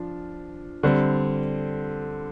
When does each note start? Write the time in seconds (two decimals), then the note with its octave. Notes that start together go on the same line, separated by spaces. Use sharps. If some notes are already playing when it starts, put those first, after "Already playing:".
Already playing: F3 D4
0.83 D3 G3 C4